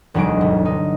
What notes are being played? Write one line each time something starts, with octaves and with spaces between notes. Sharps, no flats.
E1 D2 F#3 G#3 D#4 D7
G1
D#4